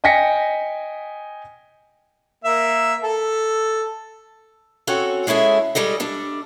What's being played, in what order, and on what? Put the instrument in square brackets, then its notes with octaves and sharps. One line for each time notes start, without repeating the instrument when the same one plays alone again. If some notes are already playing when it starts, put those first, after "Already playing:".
[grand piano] D#5 G5 G#5 A#6 B6 C#7
[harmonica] A#3 E5
A4
[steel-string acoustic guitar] C4 C#4 F#4 A4
G#3 C#4 E4 G#4 A4
G3 G#3 A4 D#5
G3 D4 A4